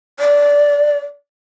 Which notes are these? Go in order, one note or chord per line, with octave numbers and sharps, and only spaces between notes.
D5